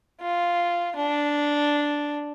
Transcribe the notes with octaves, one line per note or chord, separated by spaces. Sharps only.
F4
D4